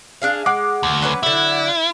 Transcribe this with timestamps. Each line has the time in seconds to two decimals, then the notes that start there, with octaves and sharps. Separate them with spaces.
0.22 D4 G#4 F5
0.46 G#3 F#5 D6
0.83 D2
1.02 F#3 C#4 B4
1.23 D3 F#3 E4